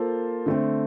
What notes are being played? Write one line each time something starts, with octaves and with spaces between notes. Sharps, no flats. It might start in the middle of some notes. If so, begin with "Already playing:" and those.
Already playing: A#3 F4 A4 C5
D3 A3 C4